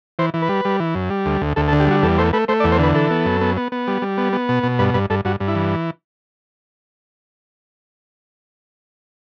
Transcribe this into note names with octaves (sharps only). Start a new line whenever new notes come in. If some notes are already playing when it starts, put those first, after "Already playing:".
E3 C5
E3
B4
G3
G3
E3
F#2
G3
D2
D2
D2 A4
A4
D3
G4
G3 F#4
E2 A4
A3 C5
A3 B4
A3 C5
D5
E2
C5
D3 B4
E3 A4
B3
F#2
B3
B3
B3
G3
G3
B3
B3
B2
B2
G2 B4
G2 B4
G2 A4
G2 F#4
G2
E4
E3